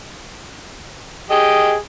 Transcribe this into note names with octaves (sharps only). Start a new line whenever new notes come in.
G4 G#4 D#5